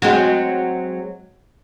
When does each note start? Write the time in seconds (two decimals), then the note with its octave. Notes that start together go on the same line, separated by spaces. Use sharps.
0.02 F#3 G#3 C4